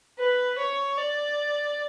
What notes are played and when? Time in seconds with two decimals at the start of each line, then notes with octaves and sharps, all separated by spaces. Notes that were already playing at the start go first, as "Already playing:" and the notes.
0.18 B4
0.58 C#5
0.97 D5